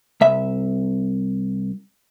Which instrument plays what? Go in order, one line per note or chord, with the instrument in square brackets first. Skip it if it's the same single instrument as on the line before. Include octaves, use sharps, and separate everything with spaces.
[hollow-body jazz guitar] C2 E5